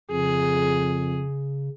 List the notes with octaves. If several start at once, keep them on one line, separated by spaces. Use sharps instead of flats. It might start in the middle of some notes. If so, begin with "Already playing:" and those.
F2 C#3 G#4